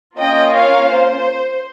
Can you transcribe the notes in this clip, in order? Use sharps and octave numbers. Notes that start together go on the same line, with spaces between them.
A#3 C#4 F4 D#5 G5
C#5 F5
C5